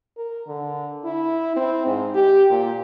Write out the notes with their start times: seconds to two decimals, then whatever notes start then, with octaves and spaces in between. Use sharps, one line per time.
0.17 A#4
0.47 D3
1.04 E4
1.56 C4
1.86 G#2
2.15 G4
2.50 A#2